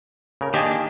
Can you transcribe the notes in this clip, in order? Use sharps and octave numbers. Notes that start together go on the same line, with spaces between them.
C#3 A#4
D#3 A#3 D4 G4 D#5 G#5